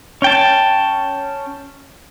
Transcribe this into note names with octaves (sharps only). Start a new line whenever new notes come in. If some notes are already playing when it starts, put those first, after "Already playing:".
C#4 G5 A5